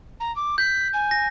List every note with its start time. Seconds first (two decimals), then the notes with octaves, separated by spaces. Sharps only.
0.19 A#5
0.35 D6
0.58 G6 B6
0.93 G#5
1.11 A#6